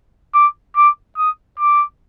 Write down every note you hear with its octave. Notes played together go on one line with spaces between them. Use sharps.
D6
D6
D#6
D6